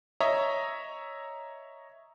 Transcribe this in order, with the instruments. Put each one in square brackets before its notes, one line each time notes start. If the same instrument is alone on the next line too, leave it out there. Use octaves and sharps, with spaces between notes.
[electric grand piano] C#5 D#5 E5 A#5